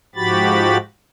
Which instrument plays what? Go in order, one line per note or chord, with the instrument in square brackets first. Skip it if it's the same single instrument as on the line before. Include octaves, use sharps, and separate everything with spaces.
[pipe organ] G#2 F3 F#4 G4 B5 A6